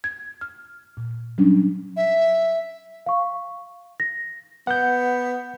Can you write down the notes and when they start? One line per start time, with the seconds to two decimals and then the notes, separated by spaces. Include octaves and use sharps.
0.04 G#6
0.41 F6
0.97 A#2
1.38 F#3 G3 C#4 D4
1.97 E5
3.06 F5 C#6
4.00 A#6
4.67 B3 F#5 G6